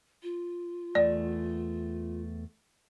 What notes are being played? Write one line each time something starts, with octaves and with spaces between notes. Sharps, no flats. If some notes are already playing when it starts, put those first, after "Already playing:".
F4
E2 A3 D5